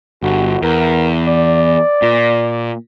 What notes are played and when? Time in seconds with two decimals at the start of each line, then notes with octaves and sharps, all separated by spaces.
0.23 G1 F#4
0.62 E2 A#4
1.27 D5
2.02 A#2